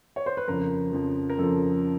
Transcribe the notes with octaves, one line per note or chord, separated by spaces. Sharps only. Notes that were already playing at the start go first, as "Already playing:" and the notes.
C#5
C5
B4
F2 C#3 F3 A#4
F2 C#3 F3
A#4
F2 C#3 F3 A4